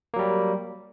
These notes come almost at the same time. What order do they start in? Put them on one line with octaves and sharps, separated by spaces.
A#3 F#3 G3